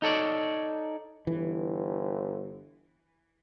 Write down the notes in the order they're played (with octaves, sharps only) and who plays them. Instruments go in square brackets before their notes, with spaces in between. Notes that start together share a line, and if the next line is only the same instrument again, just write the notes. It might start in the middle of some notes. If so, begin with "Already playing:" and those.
[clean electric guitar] D#4 A4 C#5 D5
[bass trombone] G1 [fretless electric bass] E3